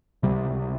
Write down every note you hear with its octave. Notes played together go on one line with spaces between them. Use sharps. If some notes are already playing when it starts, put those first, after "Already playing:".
C#2 C3 G3